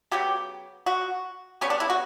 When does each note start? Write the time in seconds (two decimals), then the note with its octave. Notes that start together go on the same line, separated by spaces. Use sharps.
0.11 C#3 F#3 B3 G4
0.86 F#4
1.61 C#3 G3 B3 C#4
1.70 D4
1.80 E4
1.90 F#4